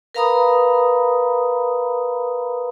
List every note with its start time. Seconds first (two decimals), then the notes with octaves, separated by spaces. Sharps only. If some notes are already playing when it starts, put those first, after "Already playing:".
0.15 A#4 B4 F5 A#5 B5 D#6